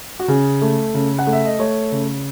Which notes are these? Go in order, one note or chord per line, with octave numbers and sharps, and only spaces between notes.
F#4
C#3 G#4
A3
C#3
F#5
A3
E5
D#5
A3 C#5
C#3